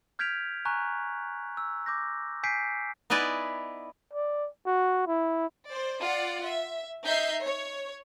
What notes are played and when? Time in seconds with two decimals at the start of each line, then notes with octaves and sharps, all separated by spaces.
0.19 F6 G6 G#6 B6 D7 F7
0.65 G#5 A#5 C#6 F#6
1.57 E6
1.86 D6 G6 A#6
2.43 G#5 G6 B6 C7 D7
3.10 B3 D#4 E4 B4 D5 G#5
4.13 D5
4.66 F#4
5.07 E4
5.69 C5 D5
6.00 F4 D5 F#5
6.47 E5
7.04 D#4 E5 G6 C7
7.42 C#5